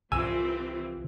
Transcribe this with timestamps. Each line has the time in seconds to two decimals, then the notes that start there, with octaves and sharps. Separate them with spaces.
0.12 C2 E3 F3 C4 G#5 E6